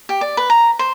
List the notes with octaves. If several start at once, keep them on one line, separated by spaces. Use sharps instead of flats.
G4
D5
B4
A#5
C5